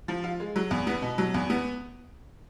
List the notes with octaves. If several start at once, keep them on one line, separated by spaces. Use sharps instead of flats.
F3
F4
G#3
F#3
E2
B3
B2
F#3
E2
B3